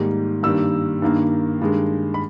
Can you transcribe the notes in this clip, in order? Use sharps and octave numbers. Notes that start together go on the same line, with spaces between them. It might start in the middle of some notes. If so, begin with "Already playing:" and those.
Already playing: G#2 D#3 G3 A#3
G2 D#3 G3 A#3 E6
G2 D#3 A#3
G2 D#3 G#3
B5